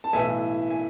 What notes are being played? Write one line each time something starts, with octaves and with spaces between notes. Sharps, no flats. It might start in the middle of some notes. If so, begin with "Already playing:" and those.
A5
B1 A2 E3 E5 G#5
G#5